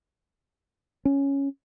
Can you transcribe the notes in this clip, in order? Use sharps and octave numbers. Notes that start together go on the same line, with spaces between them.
C#4